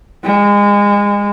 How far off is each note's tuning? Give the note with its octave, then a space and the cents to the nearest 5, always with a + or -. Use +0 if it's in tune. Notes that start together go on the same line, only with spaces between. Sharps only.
G#3 -30